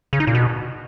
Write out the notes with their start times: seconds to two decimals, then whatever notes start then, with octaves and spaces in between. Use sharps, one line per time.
0.13 C#3
0.20 D#4
0.27 A#2
0.35 B2